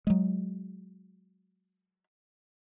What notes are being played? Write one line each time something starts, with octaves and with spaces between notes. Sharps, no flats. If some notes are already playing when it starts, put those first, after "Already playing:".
F#3 G#3